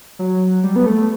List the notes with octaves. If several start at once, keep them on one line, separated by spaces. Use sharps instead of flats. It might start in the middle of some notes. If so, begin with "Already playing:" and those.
F#3
G3
B3
A3